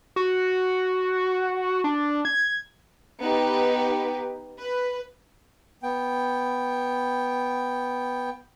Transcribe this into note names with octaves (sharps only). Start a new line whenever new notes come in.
F#4
D4
G#6
B3 D#4 G4
B4
B3 G5